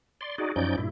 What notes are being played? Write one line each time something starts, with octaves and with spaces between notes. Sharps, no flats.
D5 C6
D#4 F#4 G#4 D5
F#2 F3 C#4 D#4 D5 G6
G2 A#2 E4